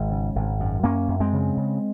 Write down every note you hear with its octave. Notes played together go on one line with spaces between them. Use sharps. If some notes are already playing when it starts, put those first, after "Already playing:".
Already playing: G#1 G#3
C#3
G#1
F#2
F#2 A#3 C#4
F#2
G#3 C4
C#3
C#3